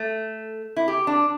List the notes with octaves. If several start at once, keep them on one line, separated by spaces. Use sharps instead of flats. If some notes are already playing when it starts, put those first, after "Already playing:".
Already playing: A3
E4
G4
D4